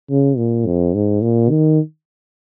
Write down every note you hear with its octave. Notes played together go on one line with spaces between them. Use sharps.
C#3
A#2
F2
G#2
A#2
D#3